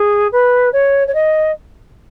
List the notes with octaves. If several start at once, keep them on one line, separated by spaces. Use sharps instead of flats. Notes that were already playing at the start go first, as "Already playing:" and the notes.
Already playing: G#4
B4
C#5
C#5
D#5